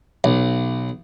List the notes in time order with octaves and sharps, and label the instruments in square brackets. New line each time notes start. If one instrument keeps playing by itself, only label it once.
[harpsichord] B1